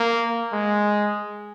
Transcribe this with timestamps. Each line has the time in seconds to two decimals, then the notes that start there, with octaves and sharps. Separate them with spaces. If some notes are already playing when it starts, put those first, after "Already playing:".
Already playing: A#3
0.52 G#3